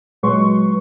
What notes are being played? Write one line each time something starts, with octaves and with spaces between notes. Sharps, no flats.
A#2 F#3 G#3 B4 C6 C#6